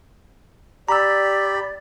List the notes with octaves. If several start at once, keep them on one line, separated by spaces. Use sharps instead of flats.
G4 D5 A#5 B5 E6